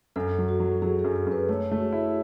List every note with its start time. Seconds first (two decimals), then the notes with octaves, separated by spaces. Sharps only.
0.16 F#2 A4
0.38 F#3
0.48 F#4
0.60 F#3
0.82 F#3 G#4
0.99 G#4
1.04 F#2
1.16 G#4
1.27 F#2
1.32 B4
1.49 A3 C#5
1.71 A3
1.78 F#4
1.82 G#4
1.93 E4